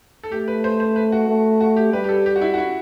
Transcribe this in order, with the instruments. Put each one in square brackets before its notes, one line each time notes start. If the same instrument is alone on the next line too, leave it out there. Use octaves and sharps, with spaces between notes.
[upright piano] A4
[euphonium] A3 [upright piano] G4
[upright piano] B4
C5
C5
B4
F#4
[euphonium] A3
[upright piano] F#4
G4
[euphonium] G3 [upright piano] B4
[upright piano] G4
A4
G4
F#4
E4
F#4
E4